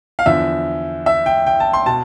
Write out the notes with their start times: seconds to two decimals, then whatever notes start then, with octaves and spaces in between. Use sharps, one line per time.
0.19 F5
0.26 E2 D3 F3 E5
1.06 E5
1.26 G5
1.46 G5
1.60 A5
1.73 C6
1.86 B2 A5